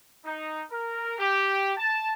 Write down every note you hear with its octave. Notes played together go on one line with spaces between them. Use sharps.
D#4
A#4
G4
A5